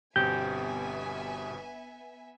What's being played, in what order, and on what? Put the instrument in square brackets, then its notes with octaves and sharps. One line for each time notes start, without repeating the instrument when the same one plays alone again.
[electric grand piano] G1 B2 C4 [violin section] B3 E5 G#5 [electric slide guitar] G4 [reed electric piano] G6